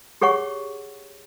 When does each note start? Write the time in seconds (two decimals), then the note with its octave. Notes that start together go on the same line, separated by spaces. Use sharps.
0.21 G4 G#4 C#5 F#5 C#6